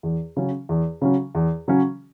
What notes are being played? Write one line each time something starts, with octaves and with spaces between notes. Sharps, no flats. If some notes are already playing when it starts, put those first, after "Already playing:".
E2
C#3 F#3 C#4
E2
C#3 F#3 C#4
E2
C#3 F#3 C#4